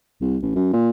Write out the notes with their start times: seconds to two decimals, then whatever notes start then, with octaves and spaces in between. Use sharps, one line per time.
0.21 C2
0.42 A1
0.55 F#2
0.73 A#2